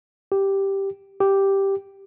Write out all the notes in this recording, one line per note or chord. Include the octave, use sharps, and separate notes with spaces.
G4
G4